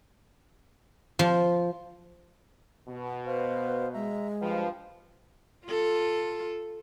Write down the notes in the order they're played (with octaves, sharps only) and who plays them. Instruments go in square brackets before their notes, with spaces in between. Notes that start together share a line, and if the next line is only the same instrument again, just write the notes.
[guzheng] F3
[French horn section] B2
[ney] B4 [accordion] C5 F5
[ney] G#3 [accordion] E5 A#5
[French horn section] G2 F3 [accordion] B4 F5 G5
[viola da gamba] F4 A4